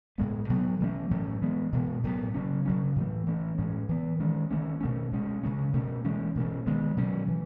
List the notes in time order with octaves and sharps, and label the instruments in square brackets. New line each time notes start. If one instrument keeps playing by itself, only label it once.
[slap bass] A2 G#3 B3
B2 F#3 B3
E3 A3 C#4
A2 F#3 A3 C#4
E3 G#3 B3
B2 G#3 B3
A2 F#3 B3
C#3 F#3 C#4
C#3 F#3 C#4
A2 E3 A3
E3 A3 C#4
A2 G#3 C#4
E3 B3
D#3 G#3 C#4
D#3 A3 C#4
B2 A3 C#4
B2 G#3 C#4
C#3 G#3 C#4
B2 A3 C#4
E3 G#3 C#4
B2 A3 C#4
D#3 G#3 B3
B2 F#3 A3 C#4
E3